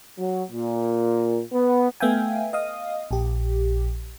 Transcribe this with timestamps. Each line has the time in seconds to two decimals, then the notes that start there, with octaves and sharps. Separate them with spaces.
0.19 F#3
0.51 A#2
1.53 B3
2.00 A3 B3 E5 F5 G5 G#5
2.53 D#5 F5 D#6
3.11 A#1 G4